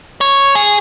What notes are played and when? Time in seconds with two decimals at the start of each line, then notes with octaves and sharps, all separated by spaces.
0.21 C#5
0.55 G#4